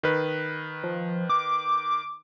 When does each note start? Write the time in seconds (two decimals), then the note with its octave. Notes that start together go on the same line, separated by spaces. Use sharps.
0.03 D#3 B4
0.83 F3
1.29 D6